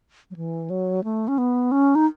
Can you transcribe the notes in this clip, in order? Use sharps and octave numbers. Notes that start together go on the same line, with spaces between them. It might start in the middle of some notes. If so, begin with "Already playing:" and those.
F#3
E3
F#3
A3
C#4
B3
C#4
D#4